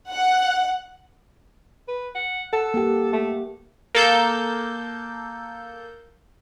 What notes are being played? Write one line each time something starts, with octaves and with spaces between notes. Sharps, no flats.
F#5
B4
F#5
A4 F#5
A#3 G4
A3
A#3 A4 G6